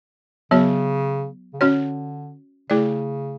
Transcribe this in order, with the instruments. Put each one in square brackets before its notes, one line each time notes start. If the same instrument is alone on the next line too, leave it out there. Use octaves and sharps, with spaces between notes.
[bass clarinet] C#3 [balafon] F#3 B3 F#4 C#5
[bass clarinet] C#3
[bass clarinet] D3 [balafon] C#4 F#4 C#5
[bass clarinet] C#3 [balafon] A3 E4 G#4 D5